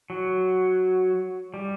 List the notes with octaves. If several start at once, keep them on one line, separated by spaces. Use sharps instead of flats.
F#3
G3